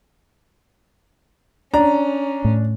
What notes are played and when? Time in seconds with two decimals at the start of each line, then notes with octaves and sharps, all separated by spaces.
1.74 C#4 D4 A#5
2.45 A2